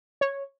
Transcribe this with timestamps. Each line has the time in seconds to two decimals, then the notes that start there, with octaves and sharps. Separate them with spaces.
0.21 C#5